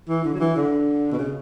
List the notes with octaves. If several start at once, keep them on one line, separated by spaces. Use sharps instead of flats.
E3
D3
F#3
E3
D3
B2
C#3